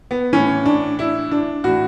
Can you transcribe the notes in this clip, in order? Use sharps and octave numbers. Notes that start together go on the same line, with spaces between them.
B3
A2 E3 C#4
D4
E4
D4
A2 E3 F#4